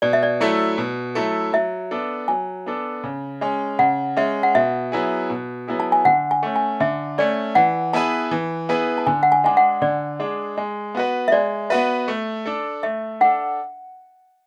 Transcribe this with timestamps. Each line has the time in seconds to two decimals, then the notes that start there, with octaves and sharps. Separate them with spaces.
0.02 B2 D5
0.13 E5
0.23 D5
0.40 F#3 A3 E4 A4
0.78 B2
1.15 F#3 A3 E4 A4
1.53 F#3 E5
1.91 B3 D4 A4
2.28 F#3 G#5
2.66 B3 D4 A4
3.04 C#3
3.41 G#3 C#4
3.79 C#3 F#5
4.17 G#3 C#4 E5
4.43 F#5
4.55 B2 E5
4.92 F#3 B3 E4 G#4
5.30 B2
5.68 F#3 B3 E4 G#4
5.80 A5
5.92 G#5
6.05 D3 F#5
6.31 G#5
6.43 A3 C#4
6.56 G#5
6.80 D3 E5
7.18 A3 C#4 D5
7.55 E3 F#5
7.93 B3 E4 G#4 B4 A5
8.31 E3
8.69 B3 E4 G#4 B4
8.98 A5
9.07 D3 G#5
9.23 F#5
9.32 G#5
9.44 G#3 D4 G#4 G#5
9.57 F#5
9.82 D3 D5
10.19 G#3 D4 G#4
10.57 G#3
10.95 B3 F#4 B4
11.28 E5
11.32 G#3 D5
11.70 B3 F#4 B4 E5
12.08 A3
12.46 D4 A4
12.83 A3 E5
13.21 D4 A4 F#5